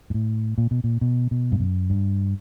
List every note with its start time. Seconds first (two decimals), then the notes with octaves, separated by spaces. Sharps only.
0.10 G#2
0.14 A2
0.58 A#2
0.71 B2
0.84 A#2
1.01 B2
1.31 B2
1.52 G2
1.60 F#2
1.90 G2